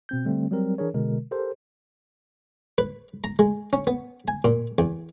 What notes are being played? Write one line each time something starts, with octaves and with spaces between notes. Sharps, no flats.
B2 C4 G6
D3 G3 A3 C4
F#3 G3 C4 A#4
E3 D4 G#4 A#4 C#5
B2 D3 G#3 A#4
G4 A4 A#4 C5
B4
A#5
G#3
C#4
B3
G#5
A#2
E2